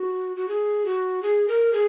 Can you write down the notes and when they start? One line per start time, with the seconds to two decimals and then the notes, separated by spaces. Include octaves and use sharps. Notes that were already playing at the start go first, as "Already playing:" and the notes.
Already playing: F#4
0.37 F#4
0.48 G#4
0.86 F#4
1.23 G#4
1.48 A#4
1.73 G#4